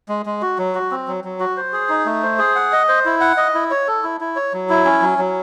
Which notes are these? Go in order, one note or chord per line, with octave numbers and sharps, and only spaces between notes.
G#3
G#3
F#4
F#3
F#4
C4
F#3
F#3
F#4
C5
G#4
D#4
A3
C5
G#4
F#5
D#5
C5
E4
F#5
D#5
E4
C#5
A4
E4
E4
C#5
F#3
E4
C#4
F#3
F#3